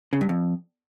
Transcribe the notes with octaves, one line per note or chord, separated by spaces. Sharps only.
C#3
G2
F2